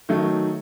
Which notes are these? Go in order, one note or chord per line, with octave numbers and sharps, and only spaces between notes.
D#3 F#3 A3 D#4